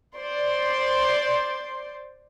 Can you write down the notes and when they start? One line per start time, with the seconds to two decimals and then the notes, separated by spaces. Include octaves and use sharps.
0.19 C5 D5 C6